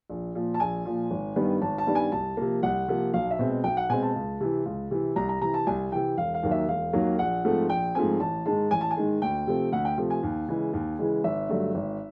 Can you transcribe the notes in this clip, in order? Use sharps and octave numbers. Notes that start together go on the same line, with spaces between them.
A#1
A#2 F3
A5
A#1 G#5
A#2 F3
G#1
G2 D#3 G3 B3
G#1 A5
A5
G2 D#3 G3 B3
G#5
C2 A5
C3 F3 A#3
C2 F#5
C3 F3 A#3
B1 F5
E5
B2 G#3 C4
B1 G5
F#5
B2 G#3 C4 G#5
A5
C#2
C3 E3
C#2
C3 E3
C2 A#5
A#5
C3 E3 A#5
A5
C2 G#5
C3 E3 G5
E1 F5
F5
D#2 D#3 F#3 A#3
E5
E1 F5
D#2 D#3 F#3 A#3
A#1 F#5
G#2 F3 A3 C4
A#1 G5
G#2 F3 A3 C4 G#5
A1 A5
G#2 D#3 G#3 A5
A1 G#5
A5
G#5
G#2 D#3 G#3
D2 G5
C3 F3 A3 C4
D2 F#5
G5
C3 F3 A3 C4
G#5
D#2
C#3 E3 G#3
D#2
C#3 E3 G#3
G#1 E5
G2 D3 F#3 A3
G#1